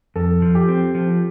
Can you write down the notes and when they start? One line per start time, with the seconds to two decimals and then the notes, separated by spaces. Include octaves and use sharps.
0.16 F2 A4
0.42 F3
0.55 G4
0.68 C4
0.95 F3